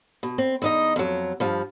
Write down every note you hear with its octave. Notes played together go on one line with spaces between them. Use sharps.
B2
C4
E2 D#4 D#5
F2 F#3
G2 F3